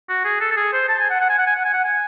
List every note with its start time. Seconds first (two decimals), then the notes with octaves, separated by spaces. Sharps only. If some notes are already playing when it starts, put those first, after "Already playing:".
0.09 F#4
0.25 G#4
0.41 A4
0.52 A4
0.57 G#4
0.73 C5
0.89 A5
1.00 G#5
1.10 F#5
1.21 F#5
1.30 G#5
1.38 F#5
1.47 G#5
1.56 F#5
1.65 G#5
1.73 F#5
1.85 G#5